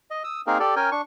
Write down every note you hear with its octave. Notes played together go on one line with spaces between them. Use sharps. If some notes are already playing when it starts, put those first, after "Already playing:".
D#5
D#6 E6
A#3 C4 D#4 G#4 A#4
G4 A4 D5
C#4 A#4 G5 G#5
D4 C#6